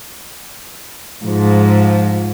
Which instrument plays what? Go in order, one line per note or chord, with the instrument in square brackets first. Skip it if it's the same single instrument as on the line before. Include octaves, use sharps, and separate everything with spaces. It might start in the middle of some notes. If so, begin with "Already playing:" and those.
[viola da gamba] G#2 [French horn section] F3